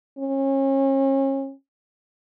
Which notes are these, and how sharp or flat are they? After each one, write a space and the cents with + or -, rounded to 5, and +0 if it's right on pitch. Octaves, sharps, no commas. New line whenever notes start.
C#4 -35